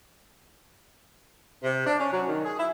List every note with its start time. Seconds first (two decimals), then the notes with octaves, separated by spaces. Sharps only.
1.64 C3
1.87 D4
1.99 C#4
2.13 F#3
2.27 D#3
2.45 G#4
2.58 E4